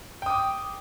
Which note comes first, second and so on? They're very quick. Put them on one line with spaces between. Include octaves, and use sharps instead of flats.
G5 D#6 D6